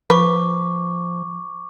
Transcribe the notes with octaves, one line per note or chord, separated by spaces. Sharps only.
F3 B4 C#6 D6